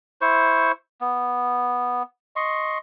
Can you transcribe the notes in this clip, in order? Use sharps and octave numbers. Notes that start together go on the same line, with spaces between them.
E4 C5 C#6
B3
D#5 C6 C#6